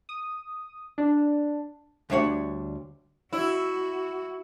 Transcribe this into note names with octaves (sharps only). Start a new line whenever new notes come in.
D#6
D4
D2 G3 D4 C#5 F#5
E4 F#4